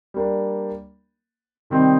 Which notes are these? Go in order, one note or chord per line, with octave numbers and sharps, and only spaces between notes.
G3 A#3 D4
C3 D#3 G3 C4 D#4